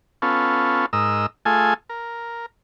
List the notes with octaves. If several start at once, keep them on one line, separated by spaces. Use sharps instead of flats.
B3 C#4 F4 A4
G#2 A#4 D#5 E6
A3 F4 G#4 A4 G#5
A#4